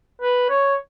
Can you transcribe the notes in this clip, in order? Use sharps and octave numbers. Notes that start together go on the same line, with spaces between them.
B4
C#5